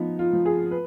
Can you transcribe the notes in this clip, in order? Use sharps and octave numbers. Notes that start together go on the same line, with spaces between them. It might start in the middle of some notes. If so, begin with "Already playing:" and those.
Already playing: F3 B3 D#4
F4
F3
G#4
B4